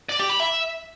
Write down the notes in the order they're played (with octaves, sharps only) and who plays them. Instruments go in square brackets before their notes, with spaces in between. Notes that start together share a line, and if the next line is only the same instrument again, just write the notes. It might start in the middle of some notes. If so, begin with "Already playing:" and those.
[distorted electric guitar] D5
G4
B5
E5